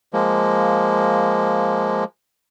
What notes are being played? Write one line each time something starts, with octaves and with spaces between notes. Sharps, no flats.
F3 G#3 A#3